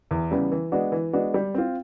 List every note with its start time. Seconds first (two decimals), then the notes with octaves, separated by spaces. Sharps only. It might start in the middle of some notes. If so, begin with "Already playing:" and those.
0.11 E2
0.31 C#3 E3 G3 B3
0.52 E3
0.72 G#3 B3 D4 F#4
0.92 E3
1.13 G#3 B3 D4 F#4
1.34 G3
1.54 C4 F4